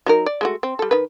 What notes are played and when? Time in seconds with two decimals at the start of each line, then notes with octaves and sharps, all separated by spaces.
0.06 F#3 D#4 A#4
0.26 D5
0.41 G#3 A3 F#4
0.63 C4
0.79 G3 A4
0.91 D#3 B4